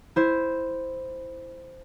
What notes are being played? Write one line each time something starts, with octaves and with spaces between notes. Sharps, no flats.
E4 C5